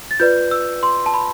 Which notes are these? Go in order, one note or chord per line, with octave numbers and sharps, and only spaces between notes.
A6
F4 B4 D5 G6
E6
C6
A5
B5